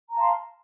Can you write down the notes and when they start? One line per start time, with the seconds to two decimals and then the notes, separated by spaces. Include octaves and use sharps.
0.10 A#5
0.13 A5
0.17 F5
0.20 C6